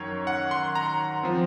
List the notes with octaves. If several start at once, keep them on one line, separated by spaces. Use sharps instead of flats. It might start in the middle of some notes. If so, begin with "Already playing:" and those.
Already playing: F#2 D#3 F#3 C#5
F#5
C6
A#5
F3 C4